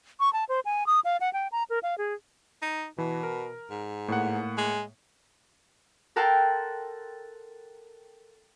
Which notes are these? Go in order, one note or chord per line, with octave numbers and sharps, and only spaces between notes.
C#6
A5
C5
G#5
D#6
F5
F#5
G5
A#5
A#4
F5
G#4
D#4
B2 E3
A#4
G#2
A2 A#3 F#5
G#3
A4 A#4 F#5 G5 A5 C6